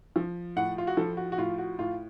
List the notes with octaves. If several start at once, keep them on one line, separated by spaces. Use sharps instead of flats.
F3
A2 F#5
F4
F#4
F3 A4
F#4
F#4
A2 F4
F#4
A2 F4